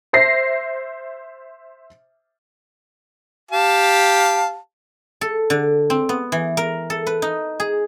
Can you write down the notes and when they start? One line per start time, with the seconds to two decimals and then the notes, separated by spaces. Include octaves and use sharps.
0.13 C5 E5 A#6 C7
3.51 G4 F5 A5
5.21 A4
5.50 D3
5.90 C4
6.09 B3
6.32 E3
6.57 A#4
6.90 A4
7.07 B4
7.22 D#4
7.60 G#4